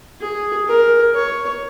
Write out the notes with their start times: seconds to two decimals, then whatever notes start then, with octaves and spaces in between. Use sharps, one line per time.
0.21 G#4
0.68 A#4
1.15 C#5